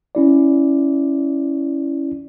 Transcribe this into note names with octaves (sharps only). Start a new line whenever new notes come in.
C#4 E4 D5